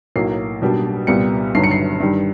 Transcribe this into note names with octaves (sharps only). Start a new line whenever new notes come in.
B1 A2 F#3 A#3 C7
B1 B2 G3 A#3 D4
C2 A#2 G3 B3 C#7
G1 G2 D#3 F#3 C7
C#7
C7
G2 D#3 G3